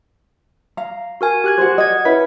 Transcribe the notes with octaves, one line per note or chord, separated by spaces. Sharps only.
F5 A#5
F#4 A#4 G#5
G4 F#6 G#6
F#4 G#4 C5
D#5 F#5 G#6
C#4 E4 B4 B6